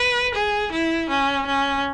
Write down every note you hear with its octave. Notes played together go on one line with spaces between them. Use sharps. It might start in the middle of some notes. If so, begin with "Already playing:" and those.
Already playing: B4
G#4
E4
C#4
C#4